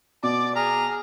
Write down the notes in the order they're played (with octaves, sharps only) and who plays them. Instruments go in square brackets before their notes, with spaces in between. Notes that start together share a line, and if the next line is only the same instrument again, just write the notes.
[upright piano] B2 [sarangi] D5 [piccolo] D6
[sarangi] G#4 [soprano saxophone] A#5 [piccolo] F6